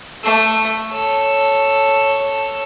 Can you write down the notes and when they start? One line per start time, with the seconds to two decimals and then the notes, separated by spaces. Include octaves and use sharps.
0.23 A3
0.91 A4 C#5